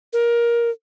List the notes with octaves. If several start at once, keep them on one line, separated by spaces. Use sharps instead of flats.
A#4